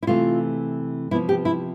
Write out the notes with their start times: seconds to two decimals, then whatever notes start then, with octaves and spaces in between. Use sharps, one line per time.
0.03 E4
0.07 C3 E3 A3 F4
1.11 C3 F3 B3 E4
1.29 G4
1.45 E4